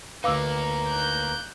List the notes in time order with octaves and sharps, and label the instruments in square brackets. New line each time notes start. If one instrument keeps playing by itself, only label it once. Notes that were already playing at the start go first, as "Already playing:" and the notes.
[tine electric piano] D2 B4 [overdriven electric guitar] A#3 D#4 [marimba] F5 D6 E6
[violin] F#6 G6